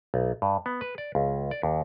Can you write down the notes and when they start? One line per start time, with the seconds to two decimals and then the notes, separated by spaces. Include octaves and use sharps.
0.14 B1
0.42 G2
0.66 B3
0.81 B4
0.98 D5
1.15 C#2
1.51 D5
1.63 D#2